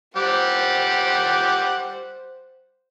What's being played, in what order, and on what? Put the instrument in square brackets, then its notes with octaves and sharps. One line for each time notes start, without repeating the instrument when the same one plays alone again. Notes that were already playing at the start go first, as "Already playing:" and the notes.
[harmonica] G3 G4 F#5 [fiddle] C5